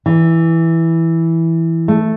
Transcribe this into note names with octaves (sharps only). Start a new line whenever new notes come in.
E3
A3